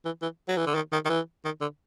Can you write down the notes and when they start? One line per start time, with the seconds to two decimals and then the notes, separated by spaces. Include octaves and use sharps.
0.05 E3
0.22 E3
0.48 F#3
0.57 E3
0.66 D3
0.75 D#3
0.92 D#3
1.05 D#3
1.09 E3
1.45 D#3
1.61 D3